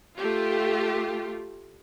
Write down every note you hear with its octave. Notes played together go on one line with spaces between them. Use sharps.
A3 F4 G4